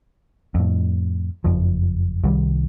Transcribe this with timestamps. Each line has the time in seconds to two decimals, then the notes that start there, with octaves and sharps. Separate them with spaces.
0.55 F2 A2
1.44 F#1 F2 F3
2.24 C2 D#3 G3